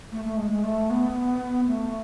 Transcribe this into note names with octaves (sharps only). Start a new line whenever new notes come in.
A3
A3
G#3
G#3
A3
B3
A3